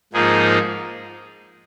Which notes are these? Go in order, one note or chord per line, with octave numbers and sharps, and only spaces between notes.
G#2 F3 A#3 D#4 G#4